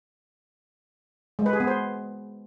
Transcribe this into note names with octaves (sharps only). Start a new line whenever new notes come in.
G#3
B4
G#4
B3
C5